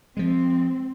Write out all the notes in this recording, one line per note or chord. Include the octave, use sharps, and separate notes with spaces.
F3 G#3 C4